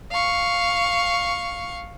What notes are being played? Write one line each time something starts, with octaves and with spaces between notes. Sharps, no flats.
F5 C#6